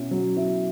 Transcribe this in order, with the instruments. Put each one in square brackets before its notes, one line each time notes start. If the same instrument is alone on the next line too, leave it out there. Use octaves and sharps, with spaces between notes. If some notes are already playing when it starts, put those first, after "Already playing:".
Already playing: [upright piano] B2 C#4 E4
F#3
E4